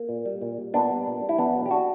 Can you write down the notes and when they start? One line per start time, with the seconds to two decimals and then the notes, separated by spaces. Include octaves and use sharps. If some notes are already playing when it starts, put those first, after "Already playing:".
Already playing: A#3
0.09 A#2
0.26 G3
0.41 A#2
0.58 G3
0.74 A#2 B3 D4
0.90 G3
1.07 A#2
1.22 G3
1.29 E4
1.38 E2 B3 D4
1.55 B2 F#3
1.66 G4
1.71 D4 F#4